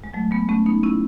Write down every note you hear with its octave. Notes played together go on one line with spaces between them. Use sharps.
G#3
F#3 A3
G#3 B3
A3 C#4
B3 D#4
C#4 E4